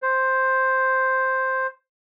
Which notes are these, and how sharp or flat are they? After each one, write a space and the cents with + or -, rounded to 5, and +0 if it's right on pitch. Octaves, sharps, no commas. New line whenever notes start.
C5 +5